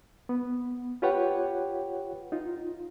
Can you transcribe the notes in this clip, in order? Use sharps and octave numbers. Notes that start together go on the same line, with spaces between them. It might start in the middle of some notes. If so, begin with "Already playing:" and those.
B3
F4 G4 B4 C#5 F#5 G5
D#4 F4